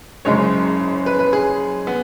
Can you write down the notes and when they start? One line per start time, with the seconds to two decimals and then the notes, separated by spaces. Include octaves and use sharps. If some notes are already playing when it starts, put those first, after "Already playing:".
0.25 F#1 F#2 C#3 G#3 C#5
1.06 B4
1.19 B4
1.33 G#4
1.87 B3